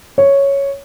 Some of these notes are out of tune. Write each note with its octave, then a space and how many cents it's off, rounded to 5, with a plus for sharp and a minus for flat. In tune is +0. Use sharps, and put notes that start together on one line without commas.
C#5 +0